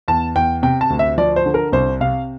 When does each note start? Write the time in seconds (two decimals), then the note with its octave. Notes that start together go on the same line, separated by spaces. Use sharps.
0.08 E2 A5
0.35 E2 G5
0.63 C3 G5
0.81 A5
0.90 D2
0.99 E5
1.18 F3 D5
1.36 C5
1.46 D3
1.54 A#4
1.72 C2 C5
2.00 C3 F5